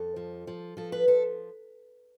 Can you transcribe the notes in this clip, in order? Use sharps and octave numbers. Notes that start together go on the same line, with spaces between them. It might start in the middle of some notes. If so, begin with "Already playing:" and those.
Already playing: F2 A4
F3
F3
F3 A4
B4
F3 A4